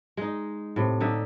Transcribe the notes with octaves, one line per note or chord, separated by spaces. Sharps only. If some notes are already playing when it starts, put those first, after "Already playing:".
G#3 D#4
A2 C3
D3 D#4 E5